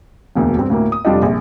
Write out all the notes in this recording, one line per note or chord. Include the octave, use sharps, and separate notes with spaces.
E1 D2 B2 A#3
G2 C4
D2 A2 A#3
D#6
F1 G3 D4 F4 G4 D#5
A#1